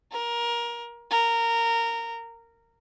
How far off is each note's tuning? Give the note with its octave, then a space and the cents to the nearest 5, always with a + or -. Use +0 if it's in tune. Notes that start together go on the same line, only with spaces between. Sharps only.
A#4 +20
A#4 -15